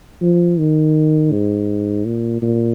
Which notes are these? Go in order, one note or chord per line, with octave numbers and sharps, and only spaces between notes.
F3
D#3
G#2
A#2
A#2